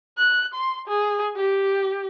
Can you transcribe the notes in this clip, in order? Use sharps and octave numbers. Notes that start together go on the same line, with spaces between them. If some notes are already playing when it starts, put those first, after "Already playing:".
F#6
C6
G#4
G4